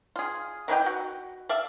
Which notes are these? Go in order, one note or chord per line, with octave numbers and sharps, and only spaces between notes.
F4 G#4
D#3 E3 G4 G5
F#4
D5 E5 F5